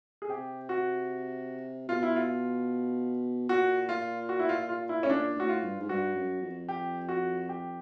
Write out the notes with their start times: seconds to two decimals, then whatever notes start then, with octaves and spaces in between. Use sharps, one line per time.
0.22 G#4
0.29 C3 G4
0.69 F#4
1.89 B2 F4
2.03 E4
2.16 F4
3.49 A#2 F#4
3.89 F4
4.29 F#4
4.39 E4
4.49 F4
4.69 F4
4.89 E4
5.03 C#4
5.09 A#2 D4
5.36 A2 F#4
5.49 F4
5.62 G2
5.80 G#2
5.89 G2 F#4
6.16 F#2
6.42 F2
6.69 G4
7.09 F#4
7.49 G4